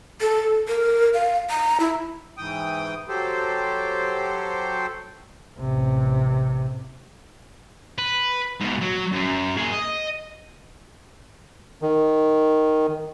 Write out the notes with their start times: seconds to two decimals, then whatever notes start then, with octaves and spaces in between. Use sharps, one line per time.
0.21 A4
0.68 A#4
1.13 F5
1.50 A#5
1.80 E4
2.38 G#2 E3 G5 D#6
3.08 F#3 G4 A4 C5
5.59 A1 C3
7.98 B4
8.60 G#2 B2
8.81 F#3
9.12 F#2
9.57 A#3 G#4
9.71 D#5
11.82 D#3